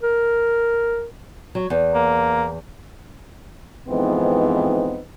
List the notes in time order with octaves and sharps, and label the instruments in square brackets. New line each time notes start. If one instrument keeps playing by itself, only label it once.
[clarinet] A#4
[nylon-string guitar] F#3
E2
[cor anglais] A#3
[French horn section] F2 G#2 E3 B3 C4 D#4